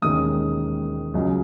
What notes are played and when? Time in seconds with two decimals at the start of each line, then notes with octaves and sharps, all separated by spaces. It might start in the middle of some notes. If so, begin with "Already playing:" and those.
0.02 E1 D#2 D#3 G#3 C#4 D#6
1.14 C#2 C#3 F#3